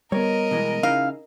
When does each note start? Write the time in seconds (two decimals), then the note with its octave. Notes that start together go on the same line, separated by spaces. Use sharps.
0.12 G3 B3 A#4 C#5 D#5
0.51 B2 E3 G#3
0.83 C#3 D#4 E4 F5